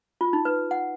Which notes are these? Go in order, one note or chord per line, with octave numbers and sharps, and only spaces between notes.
F4
D#4
B4
F#5